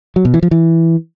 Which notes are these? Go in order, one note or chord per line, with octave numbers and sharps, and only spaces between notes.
F#3
B2
E3
F3
E3